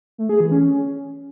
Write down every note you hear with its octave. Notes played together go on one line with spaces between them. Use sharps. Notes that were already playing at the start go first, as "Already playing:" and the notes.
A3
G#4
E3
C#4